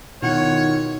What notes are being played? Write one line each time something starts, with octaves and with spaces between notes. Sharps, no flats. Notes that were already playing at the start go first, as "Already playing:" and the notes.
B2 D#3 E4 F4 C#5 F#5